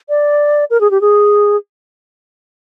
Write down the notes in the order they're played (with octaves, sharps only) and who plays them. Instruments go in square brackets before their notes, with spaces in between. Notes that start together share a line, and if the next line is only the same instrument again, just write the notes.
[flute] D5
A#4
G#4
G4
G#4